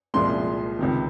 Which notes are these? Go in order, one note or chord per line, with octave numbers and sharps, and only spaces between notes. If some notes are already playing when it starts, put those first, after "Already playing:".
C2 A#2 F3 G#3 C6
C#2 C3 D#3